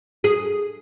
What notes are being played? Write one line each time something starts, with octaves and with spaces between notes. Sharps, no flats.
G#4